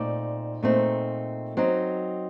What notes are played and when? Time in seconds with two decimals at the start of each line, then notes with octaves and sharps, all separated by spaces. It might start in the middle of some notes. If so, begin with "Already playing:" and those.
Already playing: A#2 A3 C4 D#4 D5
0.63 A#2 A3 C4 D#4
1.57 F#3 C4 D#4